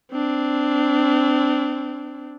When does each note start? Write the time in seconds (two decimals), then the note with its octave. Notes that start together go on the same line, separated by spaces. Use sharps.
0.12 C4 D4